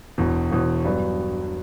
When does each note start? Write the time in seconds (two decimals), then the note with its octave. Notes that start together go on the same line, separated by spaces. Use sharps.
0.18 E1 E2 B2
0.51 E1 E2 B2
0.85 G2 F#3 B3 D4